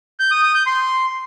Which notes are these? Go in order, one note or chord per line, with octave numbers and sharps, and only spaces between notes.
G6
D#6
D#6
G6
C6